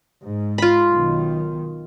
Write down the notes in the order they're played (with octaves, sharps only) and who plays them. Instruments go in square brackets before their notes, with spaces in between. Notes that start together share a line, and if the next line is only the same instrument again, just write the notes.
[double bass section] G#2
[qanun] F4 B5
[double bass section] B1 D#3